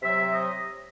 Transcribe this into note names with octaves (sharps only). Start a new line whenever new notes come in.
C3 F#3 C4 E5
D#5